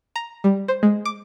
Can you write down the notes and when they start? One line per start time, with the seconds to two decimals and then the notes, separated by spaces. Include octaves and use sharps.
0.16 A#5
0.44 G3
0.68 C5
0.83 G#3
1.05 D6